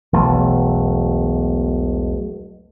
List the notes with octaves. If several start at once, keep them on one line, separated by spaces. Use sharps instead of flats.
E1 B1 A3